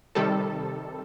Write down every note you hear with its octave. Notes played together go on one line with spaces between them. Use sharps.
C3 D#3 G3 A4